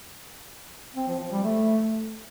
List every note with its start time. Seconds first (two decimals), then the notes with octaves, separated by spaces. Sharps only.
0.96 C4
1.08 F3
1.20 F3
1.32 G3
1.43 A3